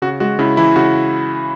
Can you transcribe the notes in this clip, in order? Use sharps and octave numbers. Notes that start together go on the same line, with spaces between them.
C#3 F#4
G#3 F#4
C#3 E4
E3 E4
C#3 F#4